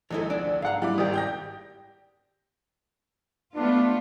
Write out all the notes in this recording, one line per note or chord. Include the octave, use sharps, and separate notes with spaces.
A#1 D#3 G#3 E4 A4
D2 D4 D5
G#2 F5 F#5 A#5
G3 E4 D6
G#1 G4 D5 D#6
G5 G6 A#6
A3 B3 D4 F4